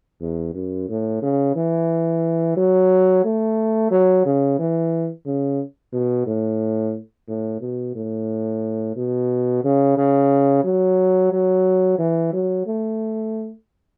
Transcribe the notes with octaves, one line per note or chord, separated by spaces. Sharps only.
E2
F#2
A2
C#3
E3
F#3
A3
F#3
C#3
E3
C#3
B2
A2
A2
B2
A2
B2
C#3
C#3
F#3
F#3
E3
F#3
A3